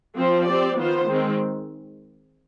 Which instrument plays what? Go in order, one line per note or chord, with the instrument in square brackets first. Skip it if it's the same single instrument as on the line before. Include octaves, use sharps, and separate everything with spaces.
[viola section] F3 C4 F4 C5
C4 G4 D5
D#3 B3 F4 C5
D#3 G#3 C4